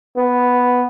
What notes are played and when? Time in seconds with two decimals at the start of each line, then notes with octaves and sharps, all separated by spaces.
0.17 B3